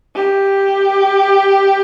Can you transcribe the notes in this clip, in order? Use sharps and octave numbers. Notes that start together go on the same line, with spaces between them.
G4